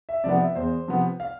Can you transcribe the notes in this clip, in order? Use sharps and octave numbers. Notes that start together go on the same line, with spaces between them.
E5
C3 F3 B3 D5
E5
E2 C5
C3 F3 B3
F5